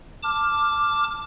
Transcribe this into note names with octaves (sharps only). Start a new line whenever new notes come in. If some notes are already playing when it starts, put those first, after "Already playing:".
A5 D6 F6